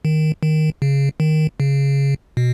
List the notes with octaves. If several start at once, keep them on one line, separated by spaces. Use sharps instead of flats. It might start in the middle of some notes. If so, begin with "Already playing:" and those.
D#3
D#3
C#3
D#3
C#3
B2